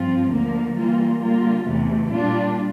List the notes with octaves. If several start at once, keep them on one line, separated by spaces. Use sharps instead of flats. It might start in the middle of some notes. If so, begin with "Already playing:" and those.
Already playing: G2 F3 C4 F4
D2 D3 F3 A#3
E3 G3 A#3 F4
D3 G3 A#3 F4
E2 C3 E3 A3
A#2 G3 D4 F4